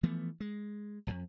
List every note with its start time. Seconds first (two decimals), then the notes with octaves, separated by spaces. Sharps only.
0.03 E3 F3 A3 B3
0.40 G#3
1.07 E1 F2